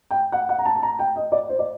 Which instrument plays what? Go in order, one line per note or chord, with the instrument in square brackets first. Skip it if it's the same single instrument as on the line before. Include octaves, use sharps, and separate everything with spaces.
[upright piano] G5
F#5
F#5
A#5
A5
A5
A#5
G5
D#5
D5
C5
D5